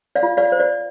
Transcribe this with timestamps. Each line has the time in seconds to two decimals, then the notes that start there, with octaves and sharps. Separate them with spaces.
0.15 D5 F5
0.23 F4
0.37 D5 F5
0.52 C5
0.60 D5